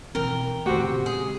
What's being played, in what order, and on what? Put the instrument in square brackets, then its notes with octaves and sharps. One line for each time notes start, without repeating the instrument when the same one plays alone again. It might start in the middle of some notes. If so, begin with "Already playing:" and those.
[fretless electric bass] B2 E3 C4 [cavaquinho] A#4 G5
[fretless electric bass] F2 D#3 A3 [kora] C4 G4 [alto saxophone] F#4
[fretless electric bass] A#2 C#3 [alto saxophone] F#4
[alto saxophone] G#3 [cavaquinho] G#4